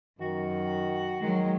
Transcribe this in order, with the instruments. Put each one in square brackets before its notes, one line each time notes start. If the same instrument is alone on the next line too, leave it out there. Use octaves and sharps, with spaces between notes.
[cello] F#2 [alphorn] D#3 [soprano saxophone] F#4
[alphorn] D#3 [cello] F#3 G#3